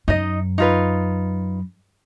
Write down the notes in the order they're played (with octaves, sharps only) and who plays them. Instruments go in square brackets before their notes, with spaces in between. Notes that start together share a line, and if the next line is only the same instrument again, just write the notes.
[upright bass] F#2 [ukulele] D#4 D#5
[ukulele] D#4 F4 B4